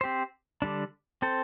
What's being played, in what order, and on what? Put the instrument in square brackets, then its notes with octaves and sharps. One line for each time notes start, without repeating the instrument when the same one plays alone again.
[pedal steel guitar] C4 G4 C5
D3 G3 D4
C4 A4 C5